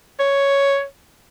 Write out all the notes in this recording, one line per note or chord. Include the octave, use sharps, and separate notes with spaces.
C#5